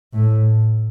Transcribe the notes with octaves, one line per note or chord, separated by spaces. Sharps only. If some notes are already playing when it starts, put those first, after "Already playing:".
A2